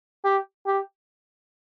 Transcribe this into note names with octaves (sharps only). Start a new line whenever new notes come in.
G4
G4